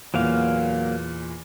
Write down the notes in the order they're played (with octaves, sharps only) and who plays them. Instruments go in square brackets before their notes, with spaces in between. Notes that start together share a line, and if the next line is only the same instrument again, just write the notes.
[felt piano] E2 A#2 [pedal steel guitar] F#3 A#3 F5